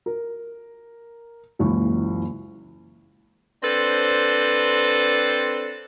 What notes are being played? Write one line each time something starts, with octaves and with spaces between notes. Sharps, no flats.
A#4
F#1 C#2 A#2 E3 C#6
C4 D4 A4 B4 C5